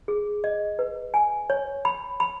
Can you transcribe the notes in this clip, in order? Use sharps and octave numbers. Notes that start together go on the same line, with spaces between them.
G#4
D#5
B4
G#5
C#5
B5
B5